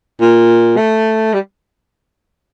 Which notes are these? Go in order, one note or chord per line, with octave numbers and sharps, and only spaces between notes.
A#2
A3
G3